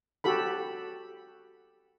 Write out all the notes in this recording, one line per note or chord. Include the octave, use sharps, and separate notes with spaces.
F#4 G4 A4 B5